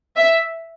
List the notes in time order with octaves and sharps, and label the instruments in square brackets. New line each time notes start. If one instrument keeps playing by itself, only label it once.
[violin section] E5